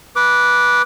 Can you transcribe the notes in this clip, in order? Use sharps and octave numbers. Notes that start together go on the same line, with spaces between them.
B4 D6